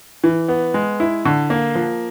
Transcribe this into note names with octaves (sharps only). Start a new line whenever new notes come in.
E3
B3
G#3
E4
D3
A#3
F3